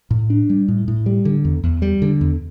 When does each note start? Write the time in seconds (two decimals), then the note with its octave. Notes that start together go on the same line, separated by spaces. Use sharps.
0.11 A2
0.30 D4
0.50 G3
0.68 A2
0.88 A2
1.06 G3
1.25 D3
1.45 E2
1.64 E2
1.82 G3
2.02 D3
2.21 E2